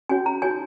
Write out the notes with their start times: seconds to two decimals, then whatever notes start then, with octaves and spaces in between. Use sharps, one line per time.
0.09 C#4 F#4 C#5 G#5
0.26 A#5
0.42 D#4 F#4 C#5 G#5